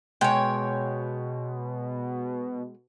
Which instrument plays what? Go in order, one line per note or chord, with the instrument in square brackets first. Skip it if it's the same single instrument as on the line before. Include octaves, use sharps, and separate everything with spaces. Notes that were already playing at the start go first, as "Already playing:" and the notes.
[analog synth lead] B2 [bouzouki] G#3 C#5 [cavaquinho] G5